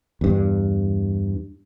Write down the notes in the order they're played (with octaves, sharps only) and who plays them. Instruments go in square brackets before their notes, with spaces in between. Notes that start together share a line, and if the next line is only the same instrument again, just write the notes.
[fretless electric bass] E2 G2